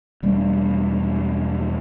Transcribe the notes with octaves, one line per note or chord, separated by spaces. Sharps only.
E1 G3 A3 D4